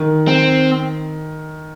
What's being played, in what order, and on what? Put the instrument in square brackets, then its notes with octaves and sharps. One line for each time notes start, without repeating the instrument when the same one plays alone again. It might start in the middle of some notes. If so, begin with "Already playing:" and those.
Already playing: [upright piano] D#3
[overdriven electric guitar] C4